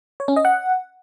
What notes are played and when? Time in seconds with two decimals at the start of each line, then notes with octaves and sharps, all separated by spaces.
0.20 C#5
0.28 C#4
0.36 D#5
0.45 F#5